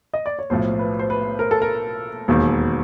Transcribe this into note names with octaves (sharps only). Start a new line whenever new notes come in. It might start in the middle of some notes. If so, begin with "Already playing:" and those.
D#5
D5
C#5
B1 A2 F3 C5
B4
C5
B4
A#4
A4
A#4
E1 D#2 D#3